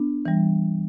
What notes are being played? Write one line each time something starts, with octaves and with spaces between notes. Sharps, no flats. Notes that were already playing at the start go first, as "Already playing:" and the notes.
Already playing: B3 D4
E3 G3